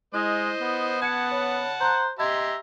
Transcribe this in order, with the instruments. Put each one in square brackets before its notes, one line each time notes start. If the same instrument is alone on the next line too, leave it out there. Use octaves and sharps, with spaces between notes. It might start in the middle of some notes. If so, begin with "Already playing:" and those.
[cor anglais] G#3 [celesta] E4 [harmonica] C5 D#5
[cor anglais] B3
[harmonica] F#5 A5 [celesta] G#6 C#7
[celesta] C#5 B5
[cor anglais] C5 [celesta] A#5 C6 F#6
[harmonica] G4 A#5 C6 [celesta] D#5 G#6 [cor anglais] E5